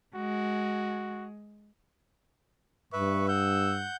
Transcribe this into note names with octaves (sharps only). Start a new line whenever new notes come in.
G#3 F#4
G2 B4 E5 C#6
F#5 E6 G6